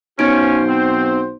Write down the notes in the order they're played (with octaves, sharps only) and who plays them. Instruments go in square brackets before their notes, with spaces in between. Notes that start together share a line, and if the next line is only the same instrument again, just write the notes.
[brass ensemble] B1 F#4 C5 [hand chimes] B3 D#4 D7 [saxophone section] C#4
[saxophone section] C4